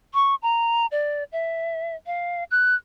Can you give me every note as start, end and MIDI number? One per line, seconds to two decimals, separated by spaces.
0.14 0.35 85
0.42 0.86 82
0.91 1.24 74
1.32 1.96 76
2.07 2.44 77
2.51 2.75 90